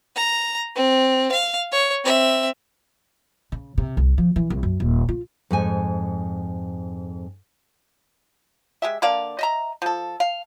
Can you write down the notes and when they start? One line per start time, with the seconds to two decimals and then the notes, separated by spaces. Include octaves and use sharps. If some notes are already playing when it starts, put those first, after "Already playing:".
0.16 A#5
0.76 C4
1.32 F5
1.72 C#5
2.04 C4 E5
3.52 C#3
3.78 C3
3.97 C2
4.18 F3
4.36 E3
4.50 C2
4.63 F#2
4.80 D#1
5.09 F4
5.51 F2 G#2 G#5
8.82 G#3 G4 E5
9.02 D3 A#3 D5 F5
9.39 D#5 E5 A#5
9.82 F3 A4
10.20 F5